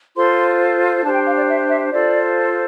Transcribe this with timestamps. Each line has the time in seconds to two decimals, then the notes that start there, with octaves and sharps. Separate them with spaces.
0.16 F4 A4 C5 C6
1.04 D4 G4 C5 A5
1.15 G5
1.27 F5
1.38 D5
1.48 E5
1.70 E5
1.92 F4 A4 C5 D5